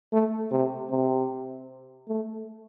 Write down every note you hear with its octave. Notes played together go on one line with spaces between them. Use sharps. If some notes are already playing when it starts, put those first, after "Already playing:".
A3
C3
C3
A3